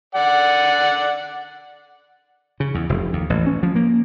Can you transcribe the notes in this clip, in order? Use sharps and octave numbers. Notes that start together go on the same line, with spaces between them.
D5 F#5
C#3
E2
F1
D#2
A1
C#4
F3
A#3